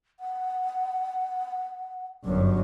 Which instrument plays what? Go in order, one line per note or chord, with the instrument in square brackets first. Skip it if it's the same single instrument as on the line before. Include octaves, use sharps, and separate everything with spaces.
[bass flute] F#5
[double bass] G1 F#2 [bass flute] F#3